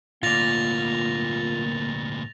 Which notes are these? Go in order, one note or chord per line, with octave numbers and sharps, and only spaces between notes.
D2 A#2 A#3 F4 D5 A6 A#6 F7